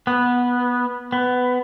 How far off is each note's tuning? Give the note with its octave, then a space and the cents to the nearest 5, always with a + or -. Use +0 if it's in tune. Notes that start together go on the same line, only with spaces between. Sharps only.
B3 -10
B3 +15